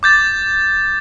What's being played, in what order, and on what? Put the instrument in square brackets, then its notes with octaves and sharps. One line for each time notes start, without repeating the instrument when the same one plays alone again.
[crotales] D6 G6 A6